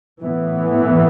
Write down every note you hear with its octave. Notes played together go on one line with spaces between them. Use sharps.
A2 E3 B3